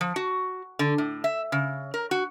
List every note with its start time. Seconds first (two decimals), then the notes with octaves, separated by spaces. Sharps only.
0.01 F3
0.16 F#4
0.79 D3
0.98 A2
1.24 E5
1.52 C#3
1.94 A#4
2.11 F#4